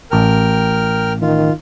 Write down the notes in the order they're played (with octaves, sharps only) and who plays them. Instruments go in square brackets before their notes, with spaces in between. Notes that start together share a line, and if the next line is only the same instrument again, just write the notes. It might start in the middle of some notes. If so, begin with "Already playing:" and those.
[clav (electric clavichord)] A1 A5 [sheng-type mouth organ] A#4 G5 F6
[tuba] D#3 [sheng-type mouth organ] F4